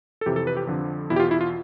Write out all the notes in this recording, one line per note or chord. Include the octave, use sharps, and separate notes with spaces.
A4
F2 C3 E3 G4
A4
B4
G4
F2 D3 F3
E2 B2 E4
G4
F4
E4
F4